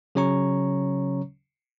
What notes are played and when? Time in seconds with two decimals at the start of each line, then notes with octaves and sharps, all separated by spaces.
0.15 C#3 F#3 C#4 C#5 A#5 C#6